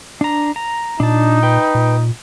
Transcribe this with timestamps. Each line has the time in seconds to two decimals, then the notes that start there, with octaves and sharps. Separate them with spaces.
0.21 D4 A#5
0.56 A#5
1.00 A#2 D4 D#4 A5
1.43 B4 G5
1.75 A#2